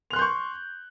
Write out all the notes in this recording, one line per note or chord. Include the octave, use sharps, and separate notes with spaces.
C6 C#6 F#6 G6 F7